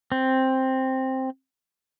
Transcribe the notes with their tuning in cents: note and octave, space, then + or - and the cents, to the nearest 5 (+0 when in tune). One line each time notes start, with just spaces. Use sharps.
C4 +5